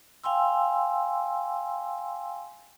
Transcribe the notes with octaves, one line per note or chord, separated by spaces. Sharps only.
F5 G5 G#5 C6 E6